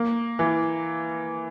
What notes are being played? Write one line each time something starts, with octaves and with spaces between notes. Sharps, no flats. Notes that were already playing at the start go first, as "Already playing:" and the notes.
Already playing: A#3
E3